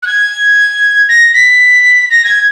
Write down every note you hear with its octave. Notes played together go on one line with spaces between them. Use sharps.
F#6
G#6
A#6
B6
A#6
G#6